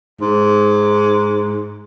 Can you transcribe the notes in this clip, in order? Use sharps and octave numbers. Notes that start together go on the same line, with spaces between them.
G#2